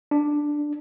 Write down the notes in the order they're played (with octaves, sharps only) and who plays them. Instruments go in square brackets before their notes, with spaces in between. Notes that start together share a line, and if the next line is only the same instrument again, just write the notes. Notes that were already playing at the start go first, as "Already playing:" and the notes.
[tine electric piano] D4